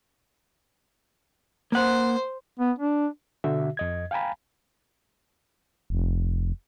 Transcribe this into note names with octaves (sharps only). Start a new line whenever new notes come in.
A#3 C5 F#5
B3
D4
B2 D3 F#4 E5
F2 D#5 G#6
F5 G5 G#5 A#5 B5
F1